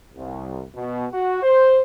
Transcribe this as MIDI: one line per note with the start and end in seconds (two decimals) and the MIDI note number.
0.15 0.63 36
0.75 1.06 47
1.12 1.40 66
1.43 1.80 72